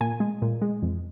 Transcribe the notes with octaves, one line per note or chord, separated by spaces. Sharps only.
A#2 G#5
G#3
A#2
G#3
F2